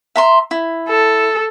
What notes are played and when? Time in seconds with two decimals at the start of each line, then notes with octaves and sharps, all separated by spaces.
0.16 E5 A#5 C6
0.51 E4
0.89 A4